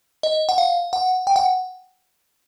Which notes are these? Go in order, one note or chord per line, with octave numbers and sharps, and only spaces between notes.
D#5
F#5
F5
F#5
G5
F#5